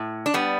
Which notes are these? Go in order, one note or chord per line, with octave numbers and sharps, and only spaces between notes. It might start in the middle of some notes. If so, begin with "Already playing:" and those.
Already playing: A2
D4
G3 B3